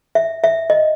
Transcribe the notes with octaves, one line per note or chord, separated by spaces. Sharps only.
E5
E5
D#5